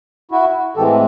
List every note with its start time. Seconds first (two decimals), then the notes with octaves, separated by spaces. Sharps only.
0.31 E4 F#4
0.77 A2 E3 G#3 C4 G4 A4